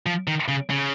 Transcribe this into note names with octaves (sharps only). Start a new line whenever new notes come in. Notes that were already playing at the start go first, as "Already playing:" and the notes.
F3
D#3
C#3
C#3